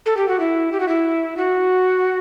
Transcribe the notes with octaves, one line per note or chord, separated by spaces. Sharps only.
A4
G4
F#4
E4
G4
F#4
E4
F#4